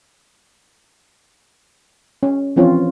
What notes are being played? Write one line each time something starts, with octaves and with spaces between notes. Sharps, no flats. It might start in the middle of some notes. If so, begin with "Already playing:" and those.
C#4
E3 F3 C4 C#4 F4 C#5